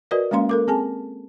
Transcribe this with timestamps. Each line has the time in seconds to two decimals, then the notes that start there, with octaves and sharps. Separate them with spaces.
0.11 F#4 A#4 B4 D5 D#5
0.31 G#3 A#3 C#4 F5 C6
0.49 A4 A#4 D6
0.68 C4 G#4 G#5 A5